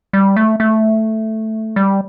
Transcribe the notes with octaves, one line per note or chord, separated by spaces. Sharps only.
G3
A3
A3
G3